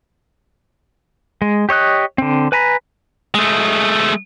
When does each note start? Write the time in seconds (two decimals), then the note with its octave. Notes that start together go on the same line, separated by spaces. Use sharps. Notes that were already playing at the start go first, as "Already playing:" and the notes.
1.42 G#3
1.69 G4 C#5 D#5 F#6
2.18 D3 C4
2.52 B4 G#5 A#5 B5
3.34 G#3 A3